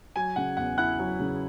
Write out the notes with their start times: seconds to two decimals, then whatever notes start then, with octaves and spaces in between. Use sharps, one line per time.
0.16 F#3 G#5
0.36 C#3 F#5
0.57 E2 F#5
0.78 E4 F#5 F#6
0.99 F#3
1.19 C#3